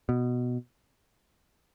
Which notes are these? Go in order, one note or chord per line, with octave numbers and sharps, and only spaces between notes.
B2